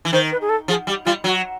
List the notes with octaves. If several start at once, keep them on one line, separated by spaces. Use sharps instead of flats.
E3
D#3 C5
B4
G#4
A4
F3 G#4
G3 G4
G3 F4
F#3 F#4